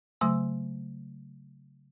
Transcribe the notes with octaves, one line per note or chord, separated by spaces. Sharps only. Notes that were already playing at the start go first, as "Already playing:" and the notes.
C#3 F#3 A3 C6 E6